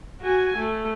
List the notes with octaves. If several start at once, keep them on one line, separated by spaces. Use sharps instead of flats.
F#4 G#5
A3